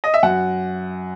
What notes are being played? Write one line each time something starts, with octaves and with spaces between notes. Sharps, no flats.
D#5
E5
F#2 F#5